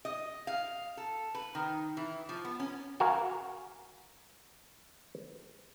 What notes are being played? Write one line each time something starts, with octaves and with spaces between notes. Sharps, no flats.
D#5
F5
A4
B4
D#3
E3
F3
B3
C#4
F#4 A#4 F5 G#5